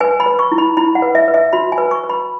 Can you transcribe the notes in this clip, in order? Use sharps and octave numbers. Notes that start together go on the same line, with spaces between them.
B4 G#5
B5
B4
C#6
E4
B5
E4 B5
F#5
B4
E5
B4
E5
F#4 B5
G#5
B4
C#6
B4
B5